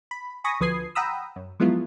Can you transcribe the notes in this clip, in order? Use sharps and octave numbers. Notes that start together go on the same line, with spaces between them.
B5
G#5 B5 C#6 D#6 A#6
D2 F3 B4 D#6 G#6 C7
F#5 G5 A#5 B5 D#6 E6
F#2
F3 F#3 G#3 B3 E4 F4